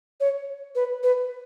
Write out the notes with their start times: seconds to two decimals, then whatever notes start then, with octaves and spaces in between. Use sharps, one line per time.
0.20 C#5
0.75 B4
1.03 B4